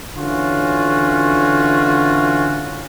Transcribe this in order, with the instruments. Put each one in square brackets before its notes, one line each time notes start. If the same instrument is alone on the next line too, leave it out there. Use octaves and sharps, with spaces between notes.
[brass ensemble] D3 E3 C#4 F4 F#4